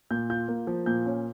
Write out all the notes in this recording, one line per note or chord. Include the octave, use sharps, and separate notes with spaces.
A#2 G6
F4 G6
A#3
F3
A#2 G6
C#4